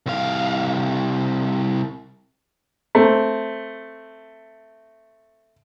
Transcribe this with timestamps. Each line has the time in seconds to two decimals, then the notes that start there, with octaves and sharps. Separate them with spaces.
0.06 C2 F5
2.95 A3 C4